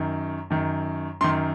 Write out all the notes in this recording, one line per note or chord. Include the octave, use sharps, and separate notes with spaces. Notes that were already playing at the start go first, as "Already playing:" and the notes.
Already playing: F#2 D#3
F#2 D#3
F#2 D#3 C6